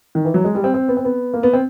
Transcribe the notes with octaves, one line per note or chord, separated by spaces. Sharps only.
D#3
E3
F#3
G#3
G3
C4
C4
B3
C4
B3
A#3
B3
C4